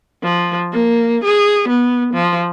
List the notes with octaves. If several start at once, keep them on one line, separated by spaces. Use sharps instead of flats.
F3
A#3
G#4
B3
F3